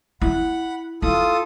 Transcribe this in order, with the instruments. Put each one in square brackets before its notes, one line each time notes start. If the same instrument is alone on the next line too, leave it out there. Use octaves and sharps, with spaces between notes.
[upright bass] E4 [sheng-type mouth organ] F#5 B5
[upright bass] E4 [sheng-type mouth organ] F4 A4 D#6